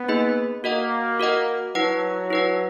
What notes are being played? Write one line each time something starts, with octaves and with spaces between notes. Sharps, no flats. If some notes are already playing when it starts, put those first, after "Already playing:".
Already playing: B3
A#3 D#4 G#4 D#5
A#3 F#4 A#4 D#5 F#5
F#4 A#4 D#5 F#5
F#3 E4 B4 F#5
E4 B4 F#5